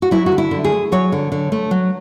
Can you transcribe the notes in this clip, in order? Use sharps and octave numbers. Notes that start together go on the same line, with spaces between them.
F#4
F#3 E4
F#4
D3
E4
D3
G#4
A3
F#3 C#5
D3
D3
A3
F#3